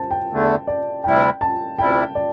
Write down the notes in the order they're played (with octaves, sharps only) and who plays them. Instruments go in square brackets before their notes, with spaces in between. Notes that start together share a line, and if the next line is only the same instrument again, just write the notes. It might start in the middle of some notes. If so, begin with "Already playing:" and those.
Already playing: [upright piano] C5 A5
G5
[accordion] E2 D3 A3
[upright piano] D5
[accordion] D2 C3 G3 E4 [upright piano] G5
[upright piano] A5
[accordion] D2 C3 G3 E4 [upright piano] G5
[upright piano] D5